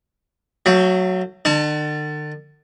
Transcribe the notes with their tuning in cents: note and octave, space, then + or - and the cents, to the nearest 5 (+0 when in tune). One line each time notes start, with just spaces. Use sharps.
F#3 +0 A3 +35
D3 +45 A5 +0